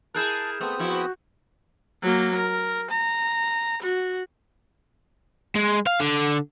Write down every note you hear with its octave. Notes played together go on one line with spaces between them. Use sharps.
E4 G#4 A#4 A5 F#6 G6 E7
A3 B3 C4 G#4 D#6
F3 E4 F#4
F#3 A#3
A#4
A#5
F#4
G#3
F5
D3